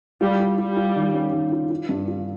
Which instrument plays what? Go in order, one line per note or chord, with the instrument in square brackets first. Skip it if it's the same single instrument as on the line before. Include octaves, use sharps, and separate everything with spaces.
[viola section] G3 [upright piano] F4
[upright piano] F4
[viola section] G3 [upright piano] F4
[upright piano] F4
D#3
C#4
D#3
F4
F4
G2
F4